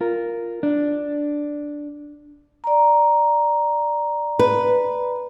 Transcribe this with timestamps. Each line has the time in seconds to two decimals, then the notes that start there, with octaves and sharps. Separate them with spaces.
0.01 F4 A#4
0.63 D4
2.64 D5 A#5
4.39 B4